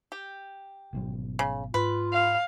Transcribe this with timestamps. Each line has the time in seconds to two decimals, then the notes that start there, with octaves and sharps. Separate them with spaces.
0.12 G4
0.93 G#1 B2 F#3
1.39 C#3
1.74 G#2 F4 B4
2.13 F5